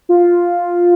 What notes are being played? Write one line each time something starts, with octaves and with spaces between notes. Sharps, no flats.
F4